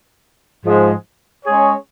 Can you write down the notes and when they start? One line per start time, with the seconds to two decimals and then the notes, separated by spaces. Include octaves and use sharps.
0.65 G#2 F3 G#3
1.45 G#3 C#4 G#4 C#5